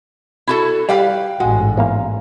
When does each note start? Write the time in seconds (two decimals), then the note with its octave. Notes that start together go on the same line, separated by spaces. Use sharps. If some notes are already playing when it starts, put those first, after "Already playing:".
0.47 E4 F#4 A4
0.89 G3 B4 F5 G5
1.40 A1 G#2 G#3 F#4
1.77 E2 A#3 F5